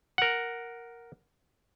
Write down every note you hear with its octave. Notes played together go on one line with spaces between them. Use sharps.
A#4 F#5